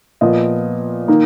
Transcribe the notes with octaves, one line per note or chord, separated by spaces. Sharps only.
A#2 F3 B3 D#5
D#3 A#3 D#4